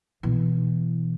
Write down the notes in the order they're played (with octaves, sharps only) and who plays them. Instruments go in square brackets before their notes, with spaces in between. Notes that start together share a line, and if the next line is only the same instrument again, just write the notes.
[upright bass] B2 E3